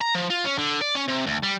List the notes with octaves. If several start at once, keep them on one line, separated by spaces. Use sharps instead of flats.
A#5
F3
F4
C#4
D3
D5
C#4
C3
D2
G3